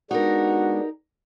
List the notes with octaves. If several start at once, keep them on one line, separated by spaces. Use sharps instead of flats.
G#3 B3 D4 D#4 F#4 G4 A#4